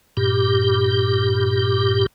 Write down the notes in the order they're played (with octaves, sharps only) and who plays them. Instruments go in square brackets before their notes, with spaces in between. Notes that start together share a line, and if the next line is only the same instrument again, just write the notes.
[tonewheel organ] G2 A#2 G4